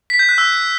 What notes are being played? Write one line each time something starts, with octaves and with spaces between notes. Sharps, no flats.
B6
G6
F#6
E6